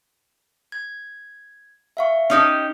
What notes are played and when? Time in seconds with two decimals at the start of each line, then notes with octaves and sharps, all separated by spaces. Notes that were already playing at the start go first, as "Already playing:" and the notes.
0.72 G#6
1.97 E5 F5 C#6
2.30 C#4 D#4 G4 C7